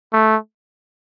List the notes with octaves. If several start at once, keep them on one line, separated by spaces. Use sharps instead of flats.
A3